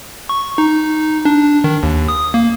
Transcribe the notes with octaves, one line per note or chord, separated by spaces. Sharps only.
C#6
D#4
D4
D#3
D#2
D#6
A#3